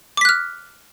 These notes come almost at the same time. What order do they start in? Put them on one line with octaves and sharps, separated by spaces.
D6 B6 F#6 F6